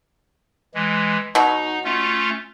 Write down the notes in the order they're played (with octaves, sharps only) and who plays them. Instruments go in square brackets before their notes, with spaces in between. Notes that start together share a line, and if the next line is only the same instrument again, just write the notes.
[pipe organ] E3 G#3
[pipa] B2 F#3 [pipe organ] D#4
[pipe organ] A3 C#4 F4